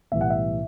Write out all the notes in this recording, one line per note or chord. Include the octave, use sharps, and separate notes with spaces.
B1 A2 E3 G3 E5
F#5
E5